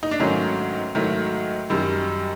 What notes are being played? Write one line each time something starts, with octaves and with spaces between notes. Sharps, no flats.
D#4
D4
G#2 D#3 F#3 A3 C#4
G#2 D#3 F#3 A3
F#2 D#3 G3